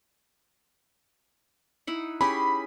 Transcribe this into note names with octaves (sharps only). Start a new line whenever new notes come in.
D#4 E4 F#5
C#4 G4 G#4 B5